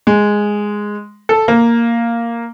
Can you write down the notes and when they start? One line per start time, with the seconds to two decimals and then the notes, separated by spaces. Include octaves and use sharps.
0.07 G#3
1.29 A4
1.48 A#3